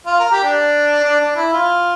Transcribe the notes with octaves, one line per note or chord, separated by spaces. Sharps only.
F4
A#4
G4
D4
D4
D4
E4
F4